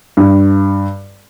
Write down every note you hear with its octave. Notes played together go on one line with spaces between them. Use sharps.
G2